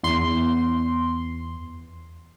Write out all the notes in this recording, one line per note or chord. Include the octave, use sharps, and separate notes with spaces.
E2 C6